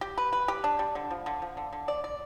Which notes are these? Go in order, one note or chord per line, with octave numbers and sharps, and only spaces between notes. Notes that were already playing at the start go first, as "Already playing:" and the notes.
G4
B4
B4
G4
D4
G3
D3
F3
D3
F3
D3
D3
D5
D5